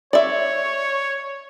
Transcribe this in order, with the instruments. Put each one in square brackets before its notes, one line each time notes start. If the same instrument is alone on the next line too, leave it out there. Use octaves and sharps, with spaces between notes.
[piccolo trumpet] C#5 [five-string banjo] D5 E5